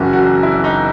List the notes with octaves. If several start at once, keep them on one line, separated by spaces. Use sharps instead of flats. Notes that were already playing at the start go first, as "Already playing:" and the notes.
Already playing: F#1 F#2 E3 F#4
F#4
E4
D#4